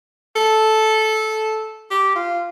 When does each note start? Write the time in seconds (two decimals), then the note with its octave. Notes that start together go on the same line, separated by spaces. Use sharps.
0.36 A4
1.90 G4
2.16 F4